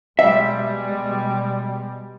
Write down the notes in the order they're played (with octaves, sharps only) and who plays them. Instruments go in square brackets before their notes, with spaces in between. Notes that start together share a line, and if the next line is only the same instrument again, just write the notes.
[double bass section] B2 G3 G#3 [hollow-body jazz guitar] E5